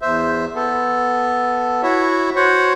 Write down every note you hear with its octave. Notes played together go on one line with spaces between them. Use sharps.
E2 C5 E5
B3 A4
E4 F#4 C#5 E5
F#4 C5 C#5 F#5